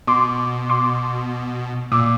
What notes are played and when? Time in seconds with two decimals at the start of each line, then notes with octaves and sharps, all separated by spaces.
0.07 B2 C6 D6
0.70 C6 D6
1.92 A#2 D6 E6